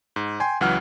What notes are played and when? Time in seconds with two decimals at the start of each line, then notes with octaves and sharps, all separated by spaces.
0.16 G#2
0.40 G5 G#5 C6
0.61 C#2 E3 F#3 F#5 F6